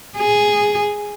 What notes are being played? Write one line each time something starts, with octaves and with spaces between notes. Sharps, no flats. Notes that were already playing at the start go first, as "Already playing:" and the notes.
G#4